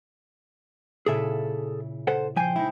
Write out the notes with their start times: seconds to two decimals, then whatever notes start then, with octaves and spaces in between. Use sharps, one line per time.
1.06 A#2 C#3 E4 G#4 A4 E5
2.07 A4 C5 F#5
2.36 F3 C5 G5 G#5
2.56 G#3 D#4 E4